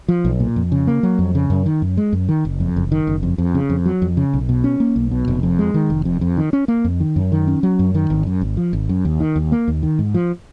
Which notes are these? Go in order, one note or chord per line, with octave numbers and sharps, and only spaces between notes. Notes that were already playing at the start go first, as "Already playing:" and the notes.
F3
B1
A#2
F2
C#3
A#3
F#3
F2
C#3
F#2
D#3
F#2
G#3
F#2
D#3
F#1
F2
F#1
D#3
F#1
F2
F2
C#3
F2
F#3
F2
C#3
B1
B2
C#4
A#3
B1
B2
F1
F2
G#3
D#3
F1
F2
F2
D#3
C#4
A#3
F2
D#3
F#2
D#3
C#4
F#3
F#2
D#3
G#1
F#2
G#1
F3
G#1
F#2
D#2
D#3
D#2
A#3
D#2
D#3
G#2
F3